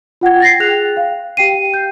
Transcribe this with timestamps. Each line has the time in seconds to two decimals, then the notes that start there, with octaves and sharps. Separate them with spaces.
0.21 F4 F#5 G5 G#6
0.40 A6 A#6 C7
0.60 G#4 G5 F#6 F7
0.97 F5
1.37 G4 F5 G5 C7 D#7
1.74 G6